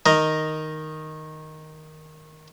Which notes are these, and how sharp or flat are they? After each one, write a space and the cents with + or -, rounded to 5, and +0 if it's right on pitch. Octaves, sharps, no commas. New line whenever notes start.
D#3 +0 A#4 +0 D#5 +0